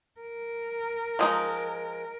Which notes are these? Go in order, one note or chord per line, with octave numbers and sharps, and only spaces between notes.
A#4
F3 G#3 D#4